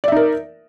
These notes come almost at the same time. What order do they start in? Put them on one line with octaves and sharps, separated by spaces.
D5 E5 D#4 A#4